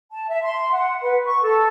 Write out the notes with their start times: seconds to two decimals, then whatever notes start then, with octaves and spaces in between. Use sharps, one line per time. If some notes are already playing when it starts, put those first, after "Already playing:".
0.12 A5
0.29 E5
0.44 C6
0.71 F#5
1.00 B4
1.25 C#6
1.42 A4